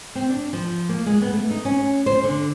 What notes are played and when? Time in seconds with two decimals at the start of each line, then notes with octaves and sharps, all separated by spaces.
0.15 C4
0.30 D4
0.53 F3
0.89 A#3
1.06 G#3
1.21 B3
1.33 A3
1.51 D#4
1.65 C#4
2.06 C5
2.24 D3